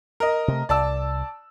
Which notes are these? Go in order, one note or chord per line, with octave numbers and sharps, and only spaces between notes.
A#4 D#5
C3 A3
C2 D5 A5 E6